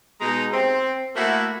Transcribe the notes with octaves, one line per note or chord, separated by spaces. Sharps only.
B2 G#3 D#4 A#5
C4
A3 A#3 E4 F#4